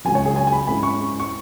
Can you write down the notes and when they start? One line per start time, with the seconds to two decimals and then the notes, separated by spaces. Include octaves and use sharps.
0.05 C#2 C#3 F#3 G#5
0.15 C#5
0.26 G#4
0.36 G#5
0.47 G#5
0.52 B5
0.67 G#2 G#3 C#4 E4 B5
0.83 C#6
1.20 C#6